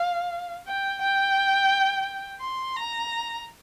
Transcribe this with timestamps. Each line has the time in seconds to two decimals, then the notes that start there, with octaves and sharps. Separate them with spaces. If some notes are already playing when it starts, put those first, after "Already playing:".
Already playing: F5
0.67 G5
1.02 G5
2.42 C6
2.76 A#5